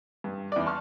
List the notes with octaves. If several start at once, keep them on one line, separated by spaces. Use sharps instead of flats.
G2
E2 D5
A5 C6 C#6 F6